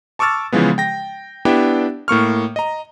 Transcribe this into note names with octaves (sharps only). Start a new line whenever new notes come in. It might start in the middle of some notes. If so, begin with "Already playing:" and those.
A5 C#6 D6 E6 F6 A6
C#3 E3 F3 G#3 B3
G5 A#6
B3 D4 E4 G4 E5 G5
A2 A#3 C#6 F6
D#5 A#5